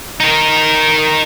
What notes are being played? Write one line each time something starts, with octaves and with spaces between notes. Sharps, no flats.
D#4 A#4